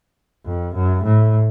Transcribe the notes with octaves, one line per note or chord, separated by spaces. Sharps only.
F2
F#2
A2